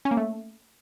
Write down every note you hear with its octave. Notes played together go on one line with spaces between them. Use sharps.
C#4
A#3
A3